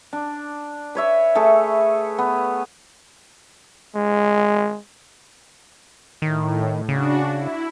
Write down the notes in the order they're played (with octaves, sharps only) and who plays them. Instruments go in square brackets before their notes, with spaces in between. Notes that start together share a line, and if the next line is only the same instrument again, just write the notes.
[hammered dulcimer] D4
B4 C#5 E5
A3 G#4 A4 B4
B3
[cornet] G#3
[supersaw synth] A2 [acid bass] D#3
[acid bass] C#3 [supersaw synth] D4 F#4
[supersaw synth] E4